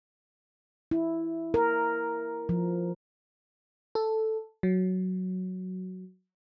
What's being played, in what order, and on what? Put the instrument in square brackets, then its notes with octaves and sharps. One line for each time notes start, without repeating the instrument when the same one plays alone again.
[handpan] E4
A#4
F3
[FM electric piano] A4
F#3